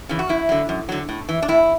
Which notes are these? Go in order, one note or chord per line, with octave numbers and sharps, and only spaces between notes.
C#3 E3
F#4
F#2 E4
D3 F#3
F#2
D3 F#3
A2
E3
D4
A2 E4